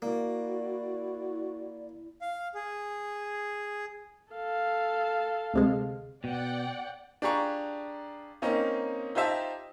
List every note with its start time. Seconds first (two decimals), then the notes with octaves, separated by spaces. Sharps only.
0.02 A#3 E4 F#4 D5
2.21 F5
2.54 G#4
4.32 A4 F5
5.53 D2 C3 G#3
6.24 B2 D5 F#5 G5
7.22 D4 F4 G4 G#4 A#5 C#6
8.42 A#3 C4 C#4 D#4
9.15 D#4 F4 G4 C5 E5 A5